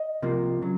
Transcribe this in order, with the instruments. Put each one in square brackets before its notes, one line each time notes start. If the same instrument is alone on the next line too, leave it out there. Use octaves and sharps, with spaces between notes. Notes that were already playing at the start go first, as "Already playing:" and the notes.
Already playing: [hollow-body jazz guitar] D#5
C2 C3 F3 A#3
C#3 F#3